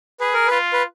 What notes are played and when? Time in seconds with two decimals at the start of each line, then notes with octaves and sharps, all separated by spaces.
0.20 G#4 B4
0.34 A#4
0.47 F4 B4
0.73 B4